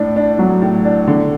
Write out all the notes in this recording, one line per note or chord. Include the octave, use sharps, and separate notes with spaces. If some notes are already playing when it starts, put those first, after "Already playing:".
Already playing: A2 D4
D4
F#3
A2
D4
D3